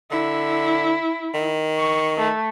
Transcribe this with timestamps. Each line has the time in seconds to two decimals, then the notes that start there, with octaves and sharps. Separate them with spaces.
0.11 D3 E4
1.34 D#3
1.78 C#6
2.17 A3